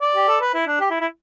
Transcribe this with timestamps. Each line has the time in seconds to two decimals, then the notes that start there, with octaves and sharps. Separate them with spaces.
0.01 D5
0.15 G4
0.28 A4
0.41 B4
0.54 E4
0.67 D4
0.80 G4
0.90 E4
1.00 E4